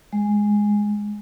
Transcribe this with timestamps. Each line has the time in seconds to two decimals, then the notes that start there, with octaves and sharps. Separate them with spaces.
0.13 G#3